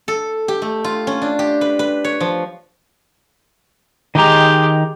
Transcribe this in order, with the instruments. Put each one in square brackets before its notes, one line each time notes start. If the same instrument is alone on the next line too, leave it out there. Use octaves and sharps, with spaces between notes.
[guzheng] A4
G4
A3
F4
C#4
D4
G4
B4
B4
C#5
F3
[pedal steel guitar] D#3 D#4 A#5 [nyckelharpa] G#3 G4